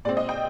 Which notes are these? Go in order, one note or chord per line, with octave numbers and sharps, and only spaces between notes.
A#2 G#3 C4 D5
D#5
G5